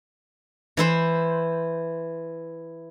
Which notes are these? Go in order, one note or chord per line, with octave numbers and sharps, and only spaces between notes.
E3 E4 C5